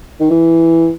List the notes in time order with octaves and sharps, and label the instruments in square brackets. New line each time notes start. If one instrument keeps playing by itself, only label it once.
[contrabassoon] D#3
E3